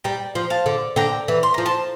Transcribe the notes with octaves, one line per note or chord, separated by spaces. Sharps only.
G3 G5 A#5
F3
F5 A5
D3
D3 G5 A#5
E3
C6
F3 A#5
A5 C6